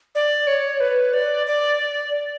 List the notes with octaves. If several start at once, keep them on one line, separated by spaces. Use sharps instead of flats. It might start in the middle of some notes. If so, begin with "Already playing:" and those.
D5
C#5
B4
D5
D5